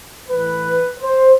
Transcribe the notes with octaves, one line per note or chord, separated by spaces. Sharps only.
A2 E3 B4
C5